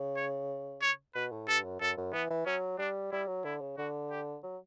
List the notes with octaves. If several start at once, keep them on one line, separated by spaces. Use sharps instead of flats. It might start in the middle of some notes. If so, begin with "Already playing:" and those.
Already playing: C#3
C#5
C#5
B2 B4
A2
G2 A4
F#2
F#2 A4
F#2
E3 B3
E3
F#3 C#4
G3 D4
G3 E4
F#3
D3 E4
C#3
D3 F#4
G4
F#3